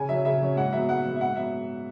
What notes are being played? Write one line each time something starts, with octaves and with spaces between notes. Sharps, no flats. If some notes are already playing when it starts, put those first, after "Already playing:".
Already playing: C#3 G#5
F#3 C#4 E5
C#3 E5
F#3 C#4
G#2 F#5
F#3 B3 E5
G#2 F#5
F#3 B3
E5
G#2 F#5
F#3 B3 E5